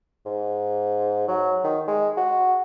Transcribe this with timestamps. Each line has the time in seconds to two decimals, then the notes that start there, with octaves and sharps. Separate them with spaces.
0.26 G#2
1.28 F#3
1.64 D#3
1.88 G#3
2.17 F#4